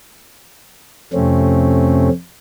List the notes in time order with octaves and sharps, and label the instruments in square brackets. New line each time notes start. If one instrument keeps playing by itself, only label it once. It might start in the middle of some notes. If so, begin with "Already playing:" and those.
[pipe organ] F2 C3 A3 C4 C#4